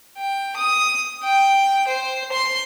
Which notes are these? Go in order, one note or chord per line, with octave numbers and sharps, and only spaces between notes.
G5
D#6
G5
C5
C6